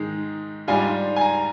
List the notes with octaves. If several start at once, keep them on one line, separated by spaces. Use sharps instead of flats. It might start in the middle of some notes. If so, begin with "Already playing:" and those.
Already playing: G#2 D#3 G#3 D#4
G#2 G3 D4 F4 G#5
G#5
A#5